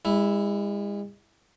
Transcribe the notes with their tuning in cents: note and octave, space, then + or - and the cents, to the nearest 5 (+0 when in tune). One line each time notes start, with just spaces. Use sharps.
G#3 -40 E4 +0